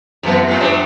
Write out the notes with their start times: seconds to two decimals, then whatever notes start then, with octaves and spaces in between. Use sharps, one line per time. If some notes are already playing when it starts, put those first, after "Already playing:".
0.23 F#2 C3 E3 B3
0.48 G#2
0.61 G3 B3 D4 C5 C#5 E5